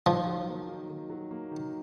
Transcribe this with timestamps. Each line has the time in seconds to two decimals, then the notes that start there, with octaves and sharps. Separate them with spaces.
0.06 D#3 F3
0.27 F#3
0.48 A#3
0.69 D#3
0.90 D#3
1.10 F#3
1.31 A#3
1.51 D#3